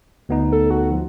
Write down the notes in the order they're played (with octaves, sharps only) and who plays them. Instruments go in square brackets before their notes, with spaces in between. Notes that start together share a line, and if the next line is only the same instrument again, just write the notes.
[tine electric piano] D2 B3 D#4
[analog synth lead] A4
F#4
F3